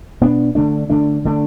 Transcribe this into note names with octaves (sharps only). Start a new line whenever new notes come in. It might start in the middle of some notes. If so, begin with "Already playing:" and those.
B2 B3 D4
D3 A3 D4
D3 A3 D4
D3 A3 D4